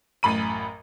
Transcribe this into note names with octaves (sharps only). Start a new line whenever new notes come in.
A1 F#2 B5 D#7